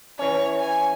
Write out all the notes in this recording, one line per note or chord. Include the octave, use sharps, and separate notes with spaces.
E3 C#4 C#5
G#5